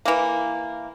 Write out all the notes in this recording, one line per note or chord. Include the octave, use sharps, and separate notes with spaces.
E3 A#3